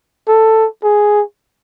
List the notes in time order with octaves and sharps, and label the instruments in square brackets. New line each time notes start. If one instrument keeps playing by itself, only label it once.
[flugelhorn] A4
G#4